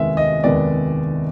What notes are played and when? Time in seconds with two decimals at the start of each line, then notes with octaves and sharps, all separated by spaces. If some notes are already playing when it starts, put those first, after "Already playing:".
Already playing: F1 D#2 D#3 G#3 B3 E5
0.17 D#5
0.44 F1 D#2 D#3 G#3 B3 D5